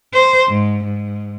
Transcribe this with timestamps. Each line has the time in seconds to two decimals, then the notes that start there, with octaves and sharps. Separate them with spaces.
0.14 C5
0.48 G#2
0.84 G#2